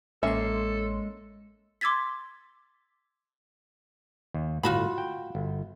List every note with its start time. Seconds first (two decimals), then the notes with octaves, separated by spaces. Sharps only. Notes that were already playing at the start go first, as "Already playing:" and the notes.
0.23 A1 G#3 A#3 C#4 A4 C#5 E5 C6
1.81 C6 D6 E6 G#6 A6 B6
4.34 D#2
4.63 G1 A2 F4 F#4 A5 B5
4.98 G5
5.35 G1